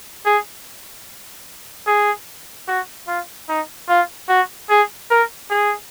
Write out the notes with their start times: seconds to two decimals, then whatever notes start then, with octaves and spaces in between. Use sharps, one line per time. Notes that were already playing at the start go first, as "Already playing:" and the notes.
0.26 G#4
1.87 G#4
2.68 F#4
3.08 F4
3.49 D#4
3.89 F4
4.29 F#4
4.70 G#4
5.11 A#4
5.50 G#4